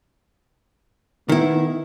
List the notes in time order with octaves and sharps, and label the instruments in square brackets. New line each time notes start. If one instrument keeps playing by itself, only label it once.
[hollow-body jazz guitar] D#3 E4 [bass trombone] B3